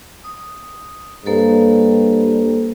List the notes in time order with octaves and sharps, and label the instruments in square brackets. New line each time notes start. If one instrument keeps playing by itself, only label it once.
[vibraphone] D#6
[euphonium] G2 [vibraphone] A#3 A4 C5